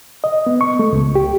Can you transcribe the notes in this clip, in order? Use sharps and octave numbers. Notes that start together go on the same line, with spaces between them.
D#5
B3
C#6
A3
C#2
G4